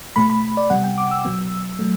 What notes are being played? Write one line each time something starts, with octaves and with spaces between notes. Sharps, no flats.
B2 A3 B5
B5
D5
C3 G3 B3 F#5
G5
D6
E6
B2 F#3 B3
F#3 A3